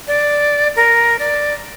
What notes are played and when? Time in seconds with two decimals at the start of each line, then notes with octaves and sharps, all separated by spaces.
0.07 D5
0.76 A#4
1.19 D5